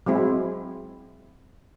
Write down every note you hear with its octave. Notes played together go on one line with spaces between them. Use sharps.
F#3 G#3 C4 E4